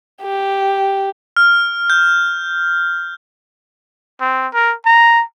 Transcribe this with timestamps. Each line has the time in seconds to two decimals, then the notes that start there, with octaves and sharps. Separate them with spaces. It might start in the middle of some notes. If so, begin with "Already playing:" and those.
0.22 G4
1.37 F6
1.90 G6
4.21 C4
4.54 A#4
4.86 A#5